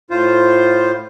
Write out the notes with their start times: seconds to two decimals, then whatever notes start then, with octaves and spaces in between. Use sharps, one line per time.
0.10 A2 F4 C5